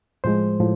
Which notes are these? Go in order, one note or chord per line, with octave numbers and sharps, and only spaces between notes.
A2 F3 G#3 C5
A2 F3